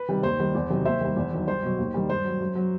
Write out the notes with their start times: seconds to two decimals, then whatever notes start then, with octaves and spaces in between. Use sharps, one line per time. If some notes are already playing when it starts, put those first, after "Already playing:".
Already playing: B4
0.08 C3 D#3 G3
0.23 D#2 C5
0.39 D#3 G3
0.55 E2
0.70 C3 D#3 F#3
0.85 D#2 C5 E5
1.01 D#3 G3
1.17 E2
1.32 D#3 F#3
1.47 C2 C5
1.63 B2 F#3
1.79 D#2
1.94 D#3 G3
2.10 G2 C5
2.25 F#3
2.40 F#2
2.55 F#3